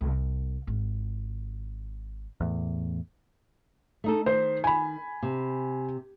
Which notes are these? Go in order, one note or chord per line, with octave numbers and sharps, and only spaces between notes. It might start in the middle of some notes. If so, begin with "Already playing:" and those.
C2
G#1 F4
E2 A2
A3 D#4 A4
D#3 C5
G#5 B5
C3